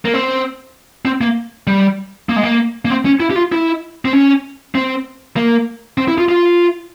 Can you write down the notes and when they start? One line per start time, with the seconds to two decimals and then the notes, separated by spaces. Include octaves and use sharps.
0.05 A#3
0.14 C4
1.05 C4
1.21 A#3
1.67 G3
2.29 A#3
2.36 G#3
2.43 A#3
2.85 A#3
2.90 C4
3.05 C#4
3.20 E4
3.31 G4
3.36 F4
3.52 E4
4.05 C4
4.13 C#4
4.75 C4
5.37 A#3
5.98 C4
6.08 E4
6.18 F4
6.29 F4